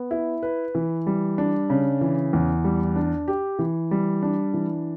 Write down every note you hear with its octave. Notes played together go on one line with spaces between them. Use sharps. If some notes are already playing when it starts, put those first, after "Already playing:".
Already playing: B3
E4
B4
E3
G3
D4
C#3
E3
E2
G3
D4
G4
E3
G3
D4
E3